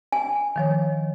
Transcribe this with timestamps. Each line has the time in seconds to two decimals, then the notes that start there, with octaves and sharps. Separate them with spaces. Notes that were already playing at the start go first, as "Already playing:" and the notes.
0.12 G#5
0.56 D#3 F3 C#5